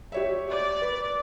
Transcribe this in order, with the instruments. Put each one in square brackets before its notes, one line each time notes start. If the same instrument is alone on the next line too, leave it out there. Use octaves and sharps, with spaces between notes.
[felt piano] G4 C#5 E5
[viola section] D5
[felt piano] B4